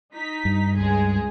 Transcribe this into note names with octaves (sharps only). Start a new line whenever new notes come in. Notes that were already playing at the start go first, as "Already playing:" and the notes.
D#4 B6
G2
C#2 G#3 G#4